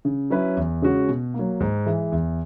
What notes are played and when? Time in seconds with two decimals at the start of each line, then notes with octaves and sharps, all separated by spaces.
0.05 C#3
0.30 F#3 C#4 E4 B4
0.57 E2
0.82 C#3 G#3 C#4 F#4
1.09 B2
1.34 F#3 A#3
1.60 G#2
1.86 E3 G#3
2.12 E2